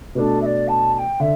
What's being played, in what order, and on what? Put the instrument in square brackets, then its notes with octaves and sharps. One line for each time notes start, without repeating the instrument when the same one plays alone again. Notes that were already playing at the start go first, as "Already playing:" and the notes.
[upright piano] B2 A3 D4 [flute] A4 B4
[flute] E5
D5
A5
A5
G5
[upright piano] D3 [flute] E5